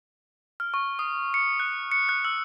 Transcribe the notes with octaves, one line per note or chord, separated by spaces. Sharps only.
F6
C#6
D#6
C#7
F#6
C#7
F#6
E6